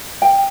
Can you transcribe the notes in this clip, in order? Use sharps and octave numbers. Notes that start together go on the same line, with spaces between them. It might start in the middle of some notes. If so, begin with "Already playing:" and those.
G5